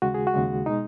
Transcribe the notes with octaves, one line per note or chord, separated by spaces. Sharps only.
D#2 C#3 G#3 F#4
G#4
F#4
D#2 C#3 G#3
B2 G#3 D#4